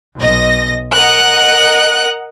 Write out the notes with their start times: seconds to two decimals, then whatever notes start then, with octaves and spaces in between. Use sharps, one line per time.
0.18 B1 D#5 A#6
0.93 A#4 D#5 F#5 F#6